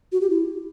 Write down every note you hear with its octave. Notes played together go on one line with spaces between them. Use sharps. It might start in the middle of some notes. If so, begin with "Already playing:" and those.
F#4
G4
E4